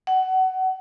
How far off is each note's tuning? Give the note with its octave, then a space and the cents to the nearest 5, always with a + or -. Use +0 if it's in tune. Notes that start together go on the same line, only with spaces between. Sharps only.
F#5 +20